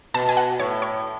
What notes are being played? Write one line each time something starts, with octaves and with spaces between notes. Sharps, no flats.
B2 A5
G#5
F#5
A2 C#5
C#5